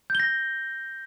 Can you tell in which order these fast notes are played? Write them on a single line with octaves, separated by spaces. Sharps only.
G6 G7 A#6